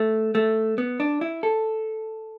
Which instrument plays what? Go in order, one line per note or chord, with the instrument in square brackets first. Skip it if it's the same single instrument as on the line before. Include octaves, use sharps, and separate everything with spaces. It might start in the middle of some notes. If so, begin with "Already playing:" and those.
Already playing: [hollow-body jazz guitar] A3
A3
B3
D4
E4
A4